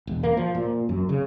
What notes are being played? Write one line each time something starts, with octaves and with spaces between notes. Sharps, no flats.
E1
A#3
F3
A#2
F#2
C#3